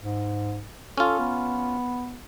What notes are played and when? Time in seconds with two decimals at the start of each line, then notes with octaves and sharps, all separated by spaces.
0.02 G#2
0.98 C#4 F4 A4
1.19 B3